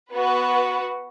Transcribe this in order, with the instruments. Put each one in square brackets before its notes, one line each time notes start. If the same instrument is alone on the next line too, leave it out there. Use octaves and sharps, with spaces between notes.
[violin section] B3 F#4 B4